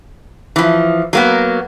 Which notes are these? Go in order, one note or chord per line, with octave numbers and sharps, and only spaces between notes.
E3 F3
F#3 A#3 B3